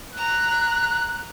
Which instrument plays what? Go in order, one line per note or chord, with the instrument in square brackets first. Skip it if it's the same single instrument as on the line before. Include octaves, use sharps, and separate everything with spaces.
[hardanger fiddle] A#5 [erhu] F#6